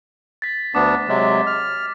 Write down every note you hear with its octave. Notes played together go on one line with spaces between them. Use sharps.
A6 B6
D2 B3 D4 D6
C3 F#3 G#3
F6